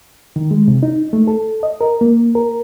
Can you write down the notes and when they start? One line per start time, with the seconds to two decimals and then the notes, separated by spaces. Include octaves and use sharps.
0.36 D#3
0.51 G#3
0.68 C3
0.83 D#4
1.13 A3
1.28 A4
1.63 D#5
1.81 A#4
2.01 A#3
2.35 A#4